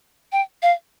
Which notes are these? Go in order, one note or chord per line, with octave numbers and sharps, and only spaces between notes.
G5
F5